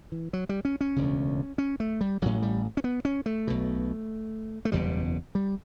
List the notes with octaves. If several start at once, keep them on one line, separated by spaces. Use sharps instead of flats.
E3
F#3
G3
C#4
C#4
E1 D2 C#3
C#4
A3
G3
A1 A2 F#3
G3
C#4
B3
C#4
A3
B1 B2
A3
F#1 E2 B2 G3
G3